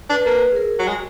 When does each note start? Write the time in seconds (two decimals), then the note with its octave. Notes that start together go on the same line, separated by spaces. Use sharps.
0.10 D4 B4
0.25 A#3 B4
0.52 G#4
0.56 A#4
0.79 F#3
0.87 G#3